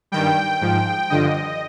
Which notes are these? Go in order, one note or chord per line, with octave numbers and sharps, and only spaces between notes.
G2 D#3 G3 G5
G#2 F3
G2 D3 F3 D#5